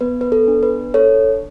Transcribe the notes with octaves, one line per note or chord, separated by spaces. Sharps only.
B3 B4
B4
A4
D4
B4
A4 C#5